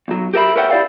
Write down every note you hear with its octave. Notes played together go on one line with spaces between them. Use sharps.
B1 F#3
G4 A#4 E5 B5
A#4 B4 C#5 E5 F#5 G5
E4 G4 D5 F5 G5